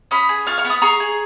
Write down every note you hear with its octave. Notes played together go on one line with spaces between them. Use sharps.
C#4 B5 D#6
G#4
F4 C#6 F6
C#6 F6
B3
B5 D#6
G#4 A#5 C#6
G#4